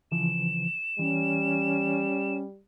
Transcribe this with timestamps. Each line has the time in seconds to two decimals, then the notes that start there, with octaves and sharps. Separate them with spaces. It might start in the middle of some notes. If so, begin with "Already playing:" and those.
0.12 C#3 E3 F3 E7
0.99 E3 G3 C#4